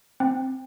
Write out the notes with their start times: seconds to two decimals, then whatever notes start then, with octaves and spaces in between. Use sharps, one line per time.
0.20 C4